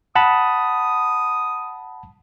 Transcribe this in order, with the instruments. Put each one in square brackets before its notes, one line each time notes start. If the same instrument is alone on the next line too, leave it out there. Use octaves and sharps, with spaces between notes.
[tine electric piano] F#5 A5 B5 [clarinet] D#6